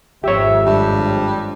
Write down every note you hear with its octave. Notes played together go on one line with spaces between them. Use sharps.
G#1 F2 G4 C#5 E5
G2 G3